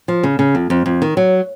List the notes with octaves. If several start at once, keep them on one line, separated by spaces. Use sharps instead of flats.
F3
C#3
C#3
F2
F2
F2
D#3
F#3